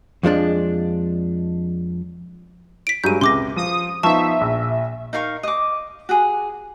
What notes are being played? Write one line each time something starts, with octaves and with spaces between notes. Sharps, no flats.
F2 F3 G#3 D4
B6 D7
G2 F#3 G#3 G6 D#7
C#2 C3 C6 D6 A#6
F3 D#6
F3 B3 D#4 E5 A5 C#6
A#1
D#4 A#4 F5 C#6
D#5 D6
F#4 G#4